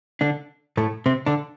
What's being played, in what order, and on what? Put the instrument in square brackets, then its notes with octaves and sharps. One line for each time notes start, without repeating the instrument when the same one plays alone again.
[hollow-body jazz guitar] D3 D4
A2 A3
C3 C4
D3 D4